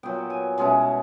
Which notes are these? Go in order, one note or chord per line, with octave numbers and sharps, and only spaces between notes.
A#2 F#3 B3 G5
G#5
B2 G#3 C#4 E4